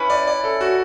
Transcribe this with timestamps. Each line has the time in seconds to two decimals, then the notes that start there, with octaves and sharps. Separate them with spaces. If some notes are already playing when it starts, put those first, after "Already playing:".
Already playing: C#4 E4 B4
0.10 D5
0.27 D5
0.44 A4
0.61 F#4